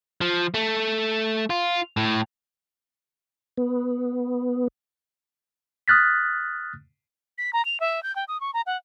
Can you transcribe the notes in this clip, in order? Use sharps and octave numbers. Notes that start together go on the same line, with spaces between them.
F3
A3
F4
A2
B3
D#6 F6 F#6 A6 B6
B6
A#5
F7
E5
G6
G5
D#6
C#6
A#5
F#5